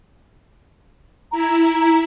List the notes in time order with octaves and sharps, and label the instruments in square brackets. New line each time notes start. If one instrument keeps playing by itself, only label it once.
[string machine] E4 [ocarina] A#5